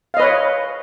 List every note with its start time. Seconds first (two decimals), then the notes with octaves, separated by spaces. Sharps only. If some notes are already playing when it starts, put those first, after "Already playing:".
0.14 F5
0.17 D#5
0.20 B4
0.22 C#5